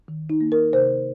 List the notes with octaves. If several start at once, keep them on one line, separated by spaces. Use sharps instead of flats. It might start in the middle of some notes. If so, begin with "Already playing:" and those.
D#3
D#4
A#3
A#4
C3 C5